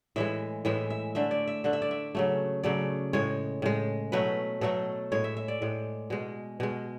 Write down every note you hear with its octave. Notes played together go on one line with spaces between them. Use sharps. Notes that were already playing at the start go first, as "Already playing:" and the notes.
A2 E3 G#3 E5
A2 E3 G#3 E5
E5
D3 A3 E5
D5
E5
D3 A3 F#5
E5
D5
E5
C#3 F#3 A3
C#3 F#3 A3 D5
A2 G#3 C#5
A2 G#3
B2 F#3 A3 B4
B2 F#3 A3 A4
A2 G#3 C#5
E5
E5
D5
A2 G#3
B2 G#3
B2 G#3